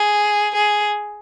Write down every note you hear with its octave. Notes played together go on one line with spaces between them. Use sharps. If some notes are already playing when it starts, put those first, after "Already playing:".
Already playing: G#4
G#4